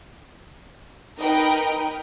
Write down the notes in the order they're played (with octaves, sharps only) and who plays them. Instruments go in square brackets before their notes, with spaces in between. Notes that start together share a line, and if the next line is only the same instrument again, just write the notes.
[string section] D#4 A#4 B4 D#5 G5